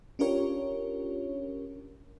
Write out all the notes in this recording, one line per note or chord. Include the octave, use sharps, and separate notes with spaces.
C#4 D4 F4 G4 A#4 C#5